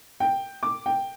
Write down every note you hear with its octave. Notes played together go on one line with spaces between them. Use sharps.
G5
D6
G5